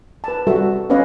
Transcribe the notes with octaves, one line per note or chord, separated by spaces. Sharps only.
B4 A5
G3 F#4 A4 E5
B3 C#4 B4 C#5 D#5 F5